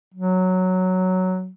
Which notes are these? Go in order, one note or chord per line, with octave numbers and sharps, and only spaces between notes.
F#3